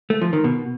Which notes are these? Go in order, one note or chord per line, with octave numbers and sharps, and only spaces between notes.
A3
F3
D#3
B2